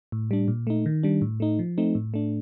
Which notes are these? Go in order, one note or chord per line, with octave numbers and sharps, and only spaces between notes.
A2
G3 D4
A#2
A3 D#4
D#3
G3 D4
A2
A3 D#4
F3
A3 C4 D#4
A2
A3 D4